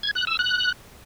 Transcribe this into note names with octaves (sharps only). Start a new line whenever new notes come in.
G#6
F#6
E6
F#6